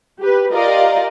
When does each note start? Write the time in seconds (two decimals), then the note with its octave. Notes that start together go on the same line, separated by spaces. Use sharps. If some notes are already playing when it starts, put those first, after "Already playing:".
0.19 G4 B4
0.51 F4 G4 A#4 D5 D#5 F5